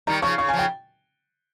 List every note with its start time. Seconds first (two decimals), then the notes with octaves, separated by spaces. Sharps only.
0.07 D#3 G3 A#5
0.22 C#3 F3 C#6
0.38 C#3 C#6
0.49 G#5
0.53 C#3 F3
0.59 G5